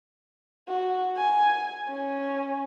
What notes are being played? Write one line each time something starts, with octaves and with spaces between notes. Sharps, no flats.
F#4
G#5
C#4